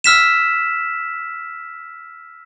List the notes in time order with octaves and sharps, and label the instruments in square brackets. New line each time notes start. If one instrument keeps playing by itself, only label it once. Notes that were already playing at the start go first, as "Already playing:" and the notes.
[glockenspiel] E6 F6 B6 E7